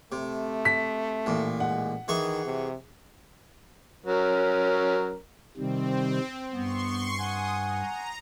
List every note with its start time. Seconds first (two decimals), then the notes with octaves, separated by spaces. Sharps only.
0.12 C3 A3
0.65 B6
1.26 A1 A#2
1.60 G#3 F#5
2.08 D#3 E3 G#4 C#6
2.45 C3
4.06 F#3 C#4 A#4
5.57 C3 D#3 G3 C4
6.53 G2 B3 C6 C#6
7.20 F#5 G#5 D#6
7.68 A#5